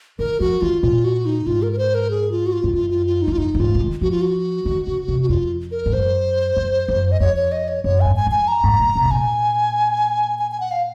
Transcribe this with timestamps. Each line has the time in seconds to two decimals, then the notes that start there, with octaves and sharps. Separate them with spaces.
0.19 D#3 A#4
0.40 F3 F#4
0.61 D#3 F4
0.82 A#2 F4
1.04 F#4
1.26 D#4
1.46 G#2 F4
1.62 A#4
1.73 A#4
1.78 C5
1.95 A#4
2.10 G#4
2.31 F4
2.46 F#4
2.53 F4
2.64 G#2
2.74 F#2 F4
2.90 F4
3.06 F4
3.22 D#4
3.28 F2
3.32 F4
3.37 F#2 D#4
3.55 F#2
3.60 G#2 F4
3.75 C#3
3.80 D#3
4.01 F3 F#4
4.11 F4
4.21 F#4
4.65 D#3
4.87 C#3
5.08 C3
5.22 F#4
5.29 F2 F4
5.72 A#4
5.86 G#2
5.93 F#2 C5
6.56 F#2
6.88 F#2
7.12 D#5
7.20 F2 C#5
7.36 C#5
7.52 D#5
7.68 C#5
7.84 F#2 C#5
8.01 G#2 G#5
8.16 G#5
8.27 F2 G#5
8.48 A#5
8.64 G#2
8.80 A#2
8.96 C3
9.05 G#2
9.11 A#2 G#5
10.39 G#5
10.51 G#5
10.60 F#5
10.71 F5